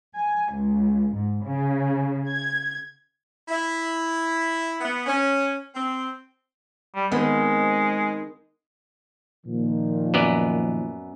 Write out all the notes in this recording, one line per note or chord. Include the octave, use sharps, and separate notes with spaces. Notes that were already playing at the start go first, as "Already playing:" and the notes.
G#5
C#2
G#2
C#3
G#6
E4
B3
C#4
C4
G3
D#3 G#3 B3 C4
A#2 D#3 F3
F#2 B3 D5